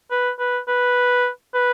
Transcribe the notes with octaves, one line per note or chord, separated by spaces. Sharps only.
B4
B4
B4
B4